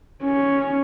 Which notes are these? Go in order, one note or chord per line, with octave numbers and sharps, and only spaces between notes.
C#4